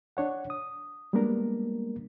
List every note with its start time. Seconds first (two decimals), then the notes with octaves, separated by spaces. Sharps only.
0.17 D4 C#5 F#5
0.50 D#6
1.13 G3 G#3 A#3 B3 D4 A#4